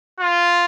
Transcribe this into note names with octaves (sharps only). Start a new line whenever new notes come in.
F4